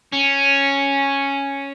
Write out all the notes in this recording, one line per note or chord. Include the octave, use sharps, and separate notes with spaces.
C#4